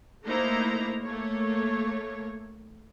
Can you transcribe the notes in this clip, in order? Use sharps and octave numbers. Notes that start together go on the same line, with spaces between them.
A3 A#3 D#4 E4 C5 A#5
A3 A#3 C#5